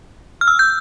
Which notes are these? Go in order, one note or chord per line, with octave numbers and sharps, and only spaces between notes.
F6
E6
G6